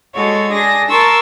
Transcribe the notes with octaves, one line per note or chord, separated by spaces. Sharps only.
G#3 F#4 A4 C#5
D4 G#4 A#6
A#4 A5 C6 C#6 E6